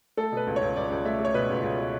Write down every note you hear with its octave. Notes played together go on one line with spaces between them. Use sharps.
A3 A4
B2
B4
C#2
C#5
C#2
C#2 D5
C#2
A3 E5
A3
C#5
B2 B4
C#2
C#2
B2